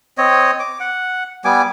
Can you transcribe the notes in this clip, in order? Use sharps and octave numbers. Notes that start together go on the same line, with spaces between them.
C4 C#5 D#5
D6
F#5
G3 B3 G#5 D6